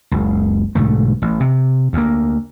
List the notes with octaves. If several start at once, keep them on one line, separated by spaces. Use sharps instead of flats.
F#1 C#2
B1 G#2 D3 A3
A1
C3
D2 A#3